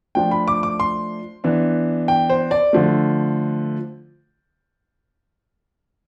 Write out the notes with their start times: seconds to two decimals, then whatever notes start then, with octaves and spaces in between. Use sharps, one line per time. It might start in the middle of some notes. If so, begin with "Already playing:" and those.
0.15 F3 A3 D4 G5
0.31 B5
0.48 D6
0.63 D6
0.80 C6
1.44 E3 B3 D4
2.08 G5
2.30 C5
2.51 D5
2.73 D3 F3 A3